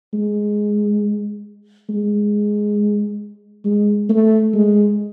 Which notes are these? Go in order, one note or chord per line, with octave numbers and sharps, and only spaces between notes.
G#3
G#3
G#3
A3
G#3